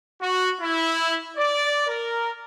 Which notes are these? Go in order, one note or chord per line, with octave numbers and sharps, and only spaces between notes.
F#4
E4
D5
A#4